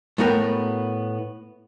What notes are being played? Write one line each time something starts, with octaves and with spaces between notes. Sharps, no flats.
A2 A3 B3 F#4 A#4 G5